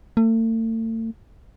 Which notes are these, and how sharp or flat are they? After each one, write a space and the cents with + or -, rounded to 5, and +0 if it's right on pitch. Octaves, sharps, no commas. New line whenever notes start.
A3 +40